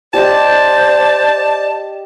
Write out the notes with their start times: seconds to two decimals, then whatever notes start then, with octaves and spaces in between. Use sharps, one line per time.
0.14 G4 C5 D5 D#5 A5